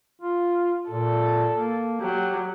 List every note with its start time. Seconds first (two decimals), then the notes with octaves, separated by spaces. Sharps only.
0.22 F4
0.90 A#2 A4
1.53 A#3
2.01 F#3 G4